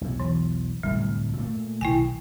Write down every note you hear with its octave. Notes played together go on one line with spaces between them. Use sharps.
B1 E2
E3
D1 C2 F2 G3
A#2 A3 A#3
B1 D#3 E4 G5 G#5